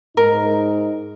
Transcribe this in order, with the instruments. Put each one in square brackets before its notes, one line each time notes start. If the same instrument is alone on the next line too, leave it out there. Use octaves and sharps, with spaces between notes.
[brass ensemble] G#2 D#4 [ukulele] A#4